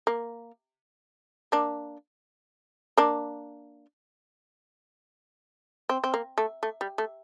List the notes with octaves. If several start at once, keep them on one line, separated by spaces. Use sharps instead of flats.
A#3
A#3 D4
A#3 D4
C4
C4
A#3
A3
A3
G3
A3